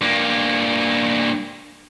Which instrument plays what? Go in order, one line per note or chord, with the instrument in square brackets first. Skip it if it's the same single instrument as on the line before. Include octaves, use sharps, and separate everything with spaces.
[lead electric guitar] G2 A#3